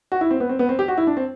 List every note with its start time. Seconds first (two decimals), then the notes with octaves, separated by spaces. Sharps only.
0.12 F#4
0.21 E4
0.31 C4
0.40 B3
0.49 C4
0.59 B3
0.69 C4
0.79 G4
0.88 F#4
0.98 E4
1.07 D4
1.17 C4